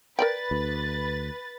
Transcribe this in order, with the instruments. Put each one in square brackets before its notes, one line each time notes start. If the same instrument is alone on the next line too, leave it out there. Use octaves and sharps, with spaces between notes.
[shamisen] A#4 D5 G5 [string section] B4 A6
[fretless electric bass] D2